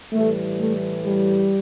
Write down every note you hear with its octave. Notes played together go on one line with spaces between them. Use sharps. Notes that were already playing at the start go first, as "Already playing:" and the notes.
A2 E3 G3 A3
A3
G3